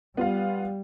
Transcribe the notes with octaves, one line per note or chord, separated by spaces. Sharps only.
G3 B3 F4 F5